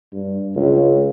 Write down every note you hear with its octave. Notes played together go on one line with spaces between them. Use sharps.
G2
C#2